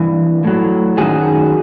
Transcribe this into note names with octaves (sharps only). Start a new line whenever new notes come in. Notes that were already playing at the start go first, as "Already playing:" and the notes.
Already playing: G2 E3
A2 F#3
F#2 D#3 F#3 F#4 G#4